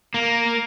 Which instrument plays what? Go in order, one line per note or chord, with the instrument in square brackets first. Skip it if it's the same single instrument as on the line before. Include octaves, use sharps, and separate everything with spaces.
[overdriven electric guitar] A#3